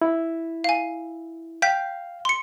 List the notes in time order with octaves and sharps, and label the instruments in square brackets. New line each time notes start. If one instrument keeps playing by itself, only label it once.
[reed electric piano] E4
[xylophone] F5 G#5
[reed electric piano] F5 [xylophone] G5 G6 B6
[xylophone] C6 C#7